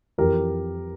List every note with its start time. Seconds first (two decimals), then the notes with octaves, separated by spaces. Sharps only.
0.18 F2 E3 G4 A#4